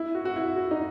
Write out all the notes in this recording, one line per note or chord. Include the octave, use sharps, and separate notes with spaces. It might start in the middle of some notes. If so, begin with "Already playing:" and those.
Already playing: E4
F#4
F#4
E4
F#4
D#4